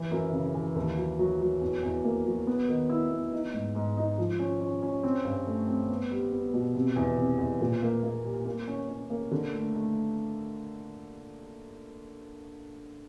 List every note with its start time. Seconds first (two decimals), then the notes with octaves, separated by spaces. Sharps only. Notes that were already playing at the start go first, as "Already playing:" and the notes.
Already playing: E3
0.11 F#2
0.33 C#3
0.55 E3
0.76 D#2
0.97 F#3
1.19 F#3
1.40 F#3
1.61 E2
1.83 E2
2.04 A#3
2.26 F#3
2.47 B3
2.69 D#3
2.89 E4
3.11 B3
3.33 D#4
3.54 G#2
3.75 G#2
3.97 D#4
4.18 F3
4.39 C#4
4.61 C#4
4.82 C#4
5.03 C4
5.25 G2
5.46 A3
5.68 C4
5.89 B3
6.11 G3
6.32 B3
6.54 B2
6.75 C3
6.96 E2
7.18 C3
7.38 E2
7.61 A#2
7.82 A#3
8.03 A#3
8.24 G3
8.45 A#3
8.67 C#4
8.89 C#4
9.10 A#3
9.31 D3
9.53 A3
9.75 A3